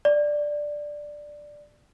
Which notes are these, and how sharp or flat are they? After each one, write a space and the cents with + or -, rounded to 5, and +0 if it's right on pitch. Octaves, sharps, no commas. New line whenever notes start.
D5 +5